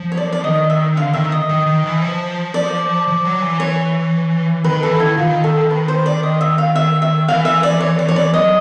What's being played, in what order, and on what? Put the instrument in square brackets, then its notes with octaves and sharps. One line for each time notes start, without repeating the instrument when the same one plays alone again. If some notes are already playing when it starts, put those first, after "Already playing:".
Already playing: [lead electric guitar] F3
[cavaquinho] C#5
D5
D5
[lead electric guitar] D#3 [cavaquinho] D#5
[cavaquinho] E5
[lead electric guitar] D3 [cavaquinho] F5
[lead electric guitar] D#3 [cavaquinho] E5
[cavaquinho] D#5
[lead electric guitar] D#3
D#3
E3
F3
[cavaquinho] D5
[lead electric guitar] F3
F#3
E3
[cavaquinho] C#5
[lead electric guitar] D#3 [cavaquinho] B4
[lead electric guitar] E3 [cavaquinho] A4
[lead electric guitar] D#3 [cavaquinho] E4
[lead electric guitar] D#3 [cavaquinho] F4
[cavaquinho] A4
B4
C5
D5
D#5
E5
F5
E5
E5
[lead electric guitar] E3 [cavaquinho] F5
[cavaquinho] E5
D5
C#5
D5
C#5
D5
[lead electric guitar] F#3 [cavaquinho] D#5